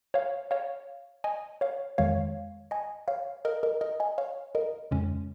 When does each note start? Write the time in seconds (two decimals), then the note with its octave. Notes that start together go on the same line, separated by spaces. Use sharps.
0.14 C#5 F5
0.51 C#5 F5
1.24 D#5 G#5
1.61 C#5 F5
1.98 F2 D#3 G#3 C#5 F5
2.71 D#5 G#5
3.08 C#5 F5
3.45 A#4 D#5
3.63 A#4 D#5
3.81 A#4 D#5
4.00 D#5 G#5
4.18 C#5 F5
4.55 A#4 D#5
4.91 F2 C#3 G#3 C#4